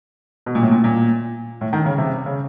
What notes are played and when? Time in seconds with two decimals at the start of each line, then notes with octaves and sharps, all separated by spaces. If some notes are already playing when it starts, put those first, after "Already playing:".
0.46 B2
0.55 A#2
0.63 A2
0.71 A#2
0.84 A#2
1.61 A2
1.73 D#3
1.86 C#3
1.98 C3
2.26 C#3